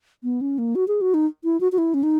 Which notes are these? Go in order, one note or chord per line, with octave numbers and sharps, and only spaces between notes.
B3
C#4
A#3
F#4
G#4
F#4
D#4
E4
F#4
F#4
E4
C#4
D#4